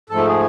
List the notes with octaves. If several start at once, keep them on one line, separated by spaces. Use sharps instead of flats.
G#2 F3 A3 A4
G#4